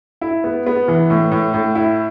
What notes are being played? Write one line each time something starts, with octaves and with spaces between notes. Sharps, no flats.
E4
B3
B3
E3
A2
A2
A2
E4